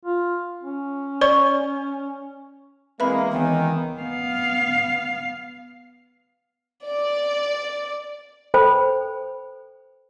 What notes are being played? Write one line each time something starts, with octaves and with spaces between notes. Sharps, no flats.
F4
C#4
C#5 D5 C#6
E3 G#3 A#3 C4 B4 E5 B5
C#2 D#3 E3 B3
B3 F5
D5
A4 B4 C5 G5 B5